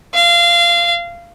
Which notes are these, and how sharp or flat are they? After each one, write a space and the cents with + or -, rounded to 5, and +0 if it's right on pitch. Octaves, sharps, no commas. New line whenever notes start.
F5 -20